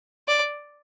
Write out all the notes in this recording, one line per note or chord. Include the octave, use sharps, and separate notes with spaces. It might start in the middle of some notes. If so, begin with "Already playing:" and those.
D5